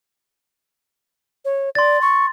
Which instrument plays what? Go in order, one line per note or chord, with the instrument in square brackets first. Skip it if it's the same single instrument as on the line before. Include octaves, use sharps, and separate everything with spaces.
[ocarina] C#5
[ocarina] D5 [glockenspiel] C6 A6
[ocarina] C#6